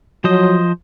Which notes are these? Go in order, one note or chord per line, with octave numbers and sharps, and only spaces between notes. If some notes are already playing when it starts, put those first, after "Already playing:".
F3 F#3 C5 D#5